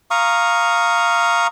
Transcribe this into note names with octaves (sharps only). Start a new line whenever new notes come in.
F5 A#5 C#6 D#6